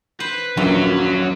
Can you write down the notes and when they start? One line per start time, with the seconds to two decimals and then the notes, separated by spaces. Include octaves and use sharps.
0.20 B4 C5
0.57 D#1 A#1 F#2 F#3